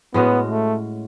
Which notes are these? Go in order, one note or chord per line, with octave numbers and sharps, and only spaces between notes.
A2 G#3 B3 C#4 F#4
A3